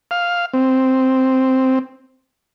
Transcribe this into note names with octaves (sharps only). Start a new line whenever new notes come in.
F5
C4